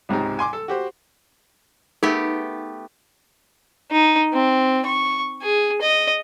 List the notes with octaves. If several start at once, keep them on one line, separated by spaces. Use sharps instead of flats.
C#2 G#2 C3 D#4
G#5 C6 D6
A4
F#4 G4 C5
A3 B3 D#4 G4 G#4 A#4
D#4
C4
C#6
G#4
D#5